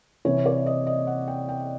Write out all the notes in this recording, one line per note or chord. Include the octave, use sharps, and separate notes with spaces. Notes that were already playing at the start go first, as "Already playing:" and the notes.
C3 E3 C#5
D5
D#5
D#5
F#5
G5
G5